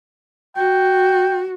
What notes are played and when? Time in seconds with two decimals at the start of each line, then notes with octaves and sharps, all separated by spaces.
0.57 F#4 G5